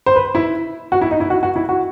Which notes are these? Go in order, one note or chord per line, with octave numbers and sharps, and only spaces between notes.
C5
B4
E4
F#4
E4
D#4
E4
F#4
F#4
E4
F#4